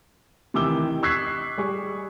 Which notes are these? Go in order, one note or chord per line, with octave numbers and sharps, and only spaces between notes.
C3 D#3 E3 D6 E6 G7
C#6 E6 F#6 G#6 B6 C7
G3 G#4 C#6